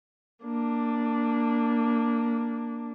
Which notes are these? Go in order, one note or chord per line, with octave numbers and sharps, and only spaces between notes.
A#3 D4